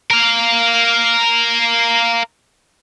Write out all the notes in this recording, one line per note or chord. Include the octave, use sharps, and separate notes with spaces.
A#4 F5